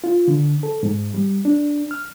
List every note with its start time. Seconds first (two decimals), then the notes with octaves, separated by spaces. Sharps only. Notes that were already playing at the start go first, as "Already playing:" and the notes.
0.04 F4
0.28 D3
0.63 A4
0.83 G#2
1.14 G3
1.45 D4
1.91 F6